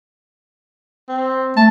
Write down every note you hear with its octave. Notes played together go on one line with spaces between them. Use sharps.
C4
A3 A5